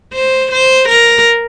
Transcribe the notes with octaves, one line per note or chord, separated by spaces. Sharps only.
C5
C5
A#4